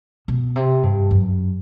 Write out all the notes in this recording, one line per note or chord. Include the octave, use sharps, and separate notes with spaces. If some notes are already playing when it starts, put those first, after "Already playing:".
B2
C3
G2
F#2